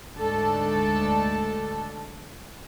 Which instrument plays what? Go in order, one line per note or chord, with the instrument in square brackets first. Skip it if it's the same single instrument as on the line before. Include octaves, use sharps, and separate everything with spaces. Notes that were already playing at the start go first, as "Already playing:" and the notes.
[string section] D2 G#2 A3 D4 A4 A5